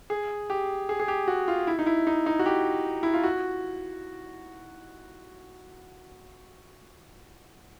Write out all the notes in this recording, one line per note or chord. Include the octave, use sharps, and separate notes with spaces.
G#4
G4
G#4
G#4
G4
F#4
F4
E4
D#4
E4
D#4
D#4
F#4
G4
E4
F4
F#4